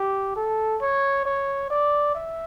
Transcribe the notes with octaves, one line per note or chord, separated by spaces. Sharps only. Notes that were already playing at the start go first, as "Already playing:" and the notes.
Already playing: G4
A4
C#5
C#5
D5
E5